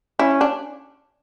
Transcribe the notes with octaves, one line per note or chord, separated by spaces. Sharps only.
C#4 E4
D4